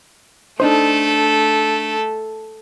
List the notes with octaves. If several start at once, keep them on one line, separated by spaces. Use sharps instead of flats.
A3 D4 D#4 A4 C5